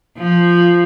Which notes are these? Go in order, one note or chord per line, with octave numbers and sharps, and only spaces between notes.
F3